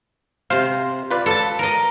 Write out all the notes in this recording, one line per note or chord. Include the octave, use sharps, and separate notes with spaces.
C3 C5 F5
F4 B4 D5
A4 A5
A#4 D#5